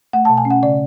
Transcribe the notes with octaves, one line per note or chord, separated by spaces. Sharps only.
A3 F#5
A5
B2
G#5
C#4
F#5
C#3 D5